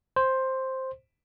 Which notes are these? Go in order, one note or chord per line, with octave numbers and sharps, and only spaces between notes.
C5